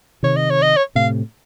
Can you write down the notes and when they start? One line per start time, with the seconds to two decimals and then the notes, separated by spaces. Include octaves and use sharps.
0.23 C3 D#3 C#5
0.36 D#5
0.50 C#5
0.62 D#5
0.77 C#5
0.95 A2 C3 F5